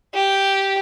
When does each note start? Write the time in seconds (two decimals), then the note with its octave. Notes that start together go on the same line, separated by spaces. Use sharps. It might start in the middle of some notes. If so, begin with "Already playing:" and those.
0.14 G4